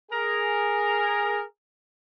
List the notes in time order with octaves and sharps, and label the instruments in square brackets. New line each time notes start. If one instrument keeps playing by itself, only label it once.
[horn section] G#4 A#4